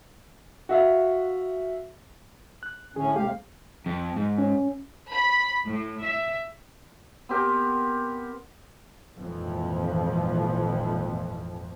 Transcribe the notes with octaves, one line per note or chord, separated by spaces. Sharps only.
F#4 E5 F5
F#6
A2 D3 C#4 G#4
D#2 C3 G#3 A3 G4 F5
F2
G#2
C#4
B5
A2
E5
B3 C4 G4 A#4
G#1 F2 A#2 E3 F3